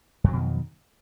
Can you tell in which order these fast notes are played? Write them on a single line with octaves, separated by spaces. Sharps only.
F2 F#3 B2 D#3